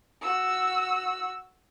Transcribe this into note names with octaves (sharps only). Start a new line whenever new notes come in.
F#4 E6